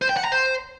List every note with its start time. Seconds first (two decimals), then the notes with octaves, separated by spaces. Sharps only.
0.02 C5
0.09 G5
0.17 F#5
0.24 A#5
0.32 C5